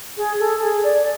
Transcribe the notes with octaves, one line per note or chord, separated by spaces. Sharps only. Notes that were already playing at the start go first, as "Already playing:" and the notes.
G#4
A4
G#4
D5